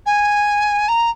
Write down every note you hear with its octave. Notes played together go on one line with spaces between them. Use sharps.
G#5
A#5